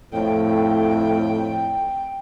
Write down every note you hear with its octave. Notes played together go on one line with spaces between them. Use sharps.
F2 A2 G5